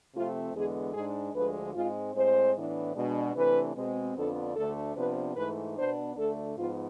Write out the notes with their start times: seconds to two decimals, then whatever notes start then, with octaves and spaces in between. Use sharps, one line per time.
0.14 C3 F3 A3 C4 F4
0.54 E2 D3 G#3 B3 G#4
0.94 G#2 G#3 D4 G#4
1.35 D2 D3 F3 G#3 B4
1.75 G#2 G#3 C4 F4
2.15 A2 G#3 C4 C5
2.56 A2 E3 B3 D4
2.95 B2 G#3 D4
3.35 C3 E3 A3 D4 B4
3.76 B2 G#3 C4
4.16 F2 D3 F3 B3 D4 A4
4.56 D2 D3 A3 D4 A4
4.96 C3 F3 B3 D4 B4
5.36 G#2 E3 A3 B4
5.77 B2 B3 D4 C5
6.17 D2 D3 A3 D4 A4
6.57 G#2 F3 B3 F4